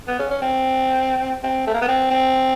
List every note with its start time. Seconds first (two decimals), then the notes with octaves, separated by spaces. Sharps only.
0.08 B3
0.19 C#4
0.30 C#4
0.42 C4
1.43 C4
1.66 A3
1.74 A#3
1.81 B3
1.88 C4
2.10 C4